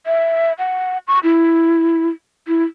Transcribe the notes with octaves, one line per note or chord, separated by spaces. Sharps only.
E5
F#5
C#6
E4
E4